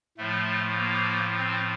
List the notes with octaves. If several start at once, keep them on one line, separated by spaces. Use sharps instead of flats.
A2 F3 A3
A#3
C4